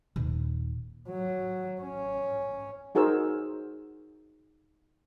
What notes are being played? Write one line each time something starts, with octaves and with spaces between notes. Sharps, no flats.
D#1
F#3
C#4
D#4 F#4 G#4 A#4 C5 E6